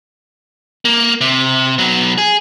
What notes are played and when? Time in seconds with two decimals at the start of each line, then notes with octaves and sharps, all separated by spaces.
0.85 A#3
1.21 C3
1.78 B2 F#3
2.18 G#4